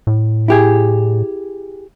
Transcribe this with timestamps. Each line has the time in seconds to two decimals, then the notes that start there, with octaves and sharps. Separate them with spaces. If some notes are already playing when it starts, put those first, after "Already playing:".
0.07 A2
0.48 E4 G4 G#4